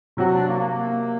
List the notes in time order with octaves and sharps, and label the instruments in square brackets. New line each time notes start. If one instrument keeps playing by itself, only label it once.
[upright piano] C3 F#3 C4 F#4
[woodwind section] D4
A#3
A#3
A#3